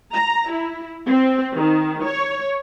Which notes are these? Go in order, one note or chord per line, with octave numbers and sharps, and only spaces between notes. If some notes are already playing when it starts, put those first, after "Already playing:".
A#5
E4
C4
D#3
C#5